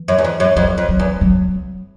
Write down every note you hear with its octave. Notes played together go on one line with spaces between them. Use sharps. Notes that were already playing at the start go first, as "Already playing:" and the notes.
Already playing: E3
F#2
E2
F2
F#2
F2 F#3
F2
F#3
E2
F#3